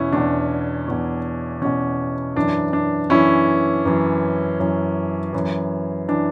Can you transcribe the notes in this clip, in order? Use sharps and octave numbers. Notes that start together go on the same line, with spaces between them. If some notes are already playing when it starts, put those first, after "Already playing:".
Already playing: E2 B2 C#4 E4
E2 B2 D4
E2 B2
E2 B2 C#4
F#2 E3 D4
D4
F#2 E3 C#4 E4
F#2 E3
F#2 E3
F#2 E3
E3 D4